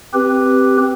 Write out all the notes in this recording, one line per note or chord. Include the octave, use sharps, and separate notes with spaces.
C4 G4 B4